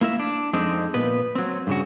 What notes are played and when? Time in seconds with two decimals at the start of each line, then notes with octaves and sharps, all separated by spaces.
0.01 A#3 E4 A#4 E5
0.19 D4
0.53 F2 G#3 C4 D4 D#4
0.94 A#2 B3 B4
1.35 F#3 C4
1.67 G2 C#3 F#4